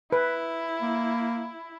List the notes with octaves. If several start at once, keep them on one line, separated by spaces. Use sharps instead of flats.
E4 B4
A#3